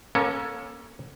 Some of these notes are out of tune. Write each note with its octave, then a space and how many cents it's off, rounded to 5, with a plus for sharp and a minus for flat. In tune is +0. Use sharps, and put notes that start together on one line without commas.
A#3 +30 C#4 -10 A4 +15